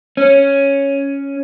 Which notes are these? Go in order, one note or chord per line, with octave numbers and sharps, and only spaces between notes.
C#4